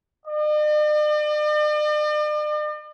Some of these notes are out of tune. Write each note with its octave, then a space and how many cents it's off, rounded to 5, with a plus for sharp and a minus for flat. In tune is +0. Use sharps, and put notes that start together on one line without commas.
D5 +45